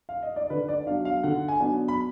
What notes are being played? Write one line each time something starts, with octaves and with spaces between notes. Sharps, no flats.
F5
D#5
D5
D3 B4
D5
F#3 B3 D4 F5
F5
D3 F#5
G#5
F#3 B3 D4
B5